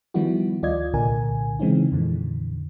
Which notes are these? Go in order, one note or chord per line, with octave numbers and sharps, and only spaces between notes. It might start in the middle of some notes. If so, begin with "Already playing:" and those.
D#3 F3 G3 B3 E4 F#4
D2 F4 D5 D#5 G#6
C2 A#2 D3 A#4 G#5
C#3 E3 G#3 C4 C#4 D#4
F2 A#2 D3 E3